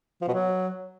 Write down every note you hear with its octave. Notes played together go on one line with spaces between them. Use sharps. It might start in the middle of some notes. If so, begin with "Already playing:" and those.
F3
B2
F#3